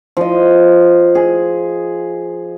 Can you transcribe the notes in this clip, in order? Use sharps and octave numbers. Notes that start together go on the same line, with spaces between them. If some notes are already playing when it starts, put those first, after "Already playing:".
F3 D#5
G#4